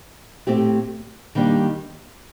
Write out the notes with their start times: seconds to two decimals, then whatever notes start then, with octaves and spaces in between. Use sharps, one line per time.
0.47 A2 A3 C4 G4
1.35 D#3 G3 A#3 D4